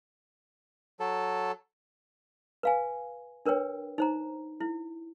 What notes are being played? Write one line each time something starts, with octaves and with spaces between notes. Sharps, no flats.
F#3 A4
B4 F5 G#5
D4 A#4 B4 C#5 G5
D#4 C5 A#5
E4